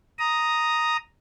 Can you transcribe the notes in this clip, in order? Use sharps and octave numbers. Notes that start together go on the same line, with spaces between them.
A#5 D#6